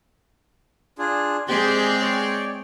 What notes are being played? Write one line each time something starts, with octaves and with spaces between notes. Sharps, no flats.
D4 F4 G#4
G#3 C4 G4 G#4 C5 D5
C#5 D5 G5